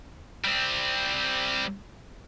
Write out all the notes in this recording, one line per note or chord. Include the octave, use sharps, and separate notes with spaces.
G3 C4